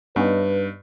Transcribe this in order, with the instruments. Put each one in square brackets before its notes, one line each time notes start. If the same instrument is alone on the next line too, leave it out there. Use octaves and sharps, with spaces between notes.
[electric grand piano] G2 [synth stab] B3 C#4 D#4 [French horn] B4